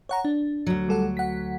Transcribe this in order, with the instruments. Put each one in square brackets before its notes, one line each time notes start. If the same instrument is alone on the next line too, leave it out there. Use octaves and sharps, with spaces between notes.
[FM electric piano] C#5 F#5 A#5
D4
[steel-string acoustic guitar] D2 F#3
[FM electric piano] G3 A4 F#5
F#5 B6